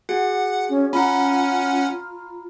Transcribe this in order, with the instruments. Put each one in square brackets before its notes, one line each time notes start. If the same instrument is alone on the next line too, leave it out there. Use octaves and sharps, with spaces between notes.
[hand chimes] F#4 G#4 [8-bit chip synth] F#5
[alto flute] C#4
[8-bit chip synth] C#4 F#5 [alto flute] F4 [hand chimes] A#5 B5